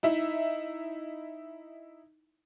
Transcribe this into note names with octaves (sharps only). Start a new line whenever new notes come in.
D#4 E4 E5